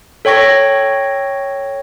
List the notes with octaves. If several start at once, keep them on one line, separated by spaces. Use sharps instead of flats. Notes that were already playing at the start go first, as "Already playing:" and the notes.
A4 C#5 G5 C#6 A#6